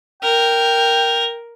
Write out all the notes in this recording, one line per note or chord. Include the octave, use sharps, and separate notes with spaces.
A#4 G5